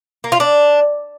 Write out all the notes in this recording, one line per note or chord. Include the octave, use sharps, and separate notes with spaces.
A#3
F4
D4